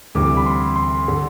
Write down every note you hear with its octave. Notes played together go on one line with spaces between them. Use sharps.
D2 C3 E3 G3 D6
B5
C6
C6
D3